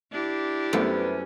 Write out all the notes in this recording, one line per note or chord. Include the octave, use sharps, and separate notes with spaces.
D4 E4 G4
F#2 C3 G3 A3 B3 C#4 B4